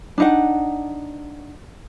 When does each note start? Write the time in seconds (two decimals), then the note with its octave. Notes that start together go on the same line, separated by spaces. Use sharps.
0.18 D4 D#4 F#5